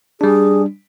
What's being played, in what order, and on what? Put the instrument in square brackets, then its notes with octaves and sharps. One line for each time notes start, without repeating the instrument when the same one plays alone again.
[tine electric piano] G3 D4 [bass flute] G#4